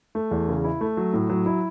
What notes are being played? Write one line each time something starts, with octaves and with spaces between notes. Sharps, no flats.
A3
E2
C#3
E4
A3
F#3
A2
F#3
E4